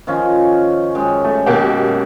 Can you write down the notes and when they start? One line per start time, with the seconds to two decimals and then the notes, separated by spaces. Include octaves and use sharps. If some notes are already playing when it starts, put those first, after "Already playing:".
0.07 D#3 F3 C#4
0.95 F#2 G#3 G5
1.24 A3
1.46 B2 A#3 G4